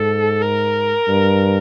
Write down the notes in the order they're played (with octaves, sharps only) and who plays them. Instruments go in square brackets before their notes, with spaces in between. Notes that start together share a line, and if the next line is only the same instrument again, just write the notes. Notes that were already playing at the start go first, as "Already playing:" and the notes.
Already playing: [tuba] G#2 [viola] A4
[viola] A#4
[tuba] G2